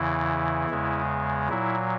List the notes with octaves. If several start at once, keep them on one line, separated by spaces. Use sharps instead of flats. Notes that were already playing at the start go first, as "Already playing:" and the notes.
Already playing: E2 C#3 E3 E4
E2 C#3 G#3
A#2 F#3 E4